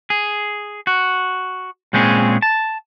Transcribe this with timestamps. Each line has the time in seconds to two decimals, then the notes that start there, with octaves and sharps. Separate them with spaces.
0.10 G#4
0.87 F#4
1.93 A#2 G#3 C4 C#4 G#4
2.42 A5